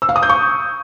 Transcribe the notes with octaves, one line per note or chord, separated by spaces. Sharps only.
E6
F5
D#6
G6
C#6